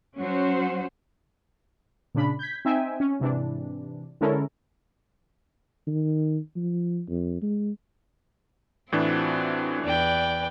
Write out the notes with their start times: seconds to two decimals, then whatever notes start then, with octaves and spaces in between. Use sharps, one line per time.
0.19 F#3 C#4 F#4 C5
2.15 A#2 C#3 D4 B5
2.39 G6 G#6 B6
2.65 C4 D#4 E5 G5 G#5
3.00 C#4
3.20 G#2 C3 E3 D4
4.21 D3 G#3 C#4 E4 A4 A#4
5.87 D#3
6.56 F3
7.08 F2
7.42 G#3
8.92 A2 E3 C4 D4 F4 F#4
9.84 E2 B4 D5 G5